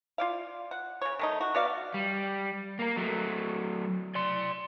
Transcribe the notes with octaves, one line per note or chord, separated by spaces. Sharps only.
F4 D5 F5
F#5
C#3 C#5
D#3 A3 D#4
F#4
B3 F#4 D5 F5
G3
A#3 A#4
F#3 A3
D5 C6